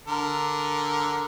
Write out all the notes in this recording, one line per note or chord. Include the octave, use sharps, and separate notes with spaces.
D3 A#4